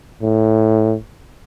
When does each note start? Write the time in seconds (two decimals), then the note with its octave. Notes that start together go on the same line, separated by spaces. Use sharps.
0.22 A2